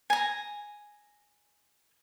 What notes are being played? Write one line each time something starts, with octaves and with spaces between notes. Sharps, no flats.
G#5 A#5